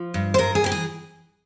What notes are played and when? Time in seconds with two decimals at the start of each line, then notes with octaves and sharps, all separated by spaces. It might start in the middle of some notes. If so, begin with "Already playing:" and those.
Already playing: F3
0.14 G2
0.34 C5
0.38 G2 A#4
0.55 G#4
0.64 E3 G4
0.72 G#4